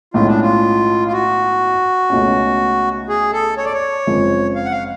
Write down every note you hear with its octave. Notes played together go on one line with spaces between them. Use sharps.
B1 A2 G#3 C#4 F4
D4
F4
F4
F#4
C#2 B2 A3 C#4
G#4
A4
C#5
D5
C#5
F#1 F2 F3 G#3
F5
F#5
F5